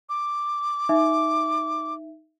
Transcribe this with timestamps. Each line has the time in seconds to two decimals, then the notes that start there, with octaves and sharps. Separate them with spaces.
0.09 D6
0.89 D#4 E5